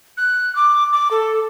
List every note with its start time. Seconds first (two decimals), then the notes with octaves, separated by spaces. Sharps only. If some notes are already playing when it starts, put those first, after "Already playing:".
0.17 F#6
0.56 D6
0.93 D6
1.11 A4